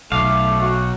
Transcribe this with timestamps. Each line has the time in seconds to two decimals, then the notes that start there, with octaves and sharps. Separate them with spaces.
0.12 B1 A3 F5 D6
0.60 F#4